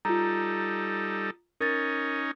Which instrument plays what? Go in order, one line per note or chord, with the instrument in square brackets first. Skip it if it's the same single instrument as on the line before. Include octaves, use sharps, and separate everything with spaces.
[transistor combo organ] G3 D#4 A4 [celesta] F4 A#5
[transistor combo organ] C#4 D#4 [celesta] A#4 A6